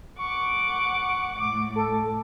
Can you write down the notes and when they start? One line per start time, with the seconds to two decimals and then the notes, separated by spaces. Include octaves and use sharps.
0.19 F#5 C#6 D6
1.39 A2 D6
1.76 A4